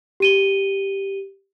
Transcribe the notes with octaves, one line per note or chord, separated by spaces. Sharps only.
G4 D#7 G7